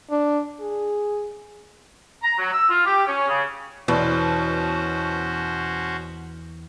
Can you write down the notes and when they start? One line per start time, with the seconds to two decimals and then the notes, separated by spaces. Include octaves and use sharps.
0.11 D4
0.60 G#4
2.22 A#5
2.37 F#3
2.52 E6
2.68 F4
2.85 G4
3.06 C#4
3.28 C#3
3.88 E2 B2 C#4 F#4 C5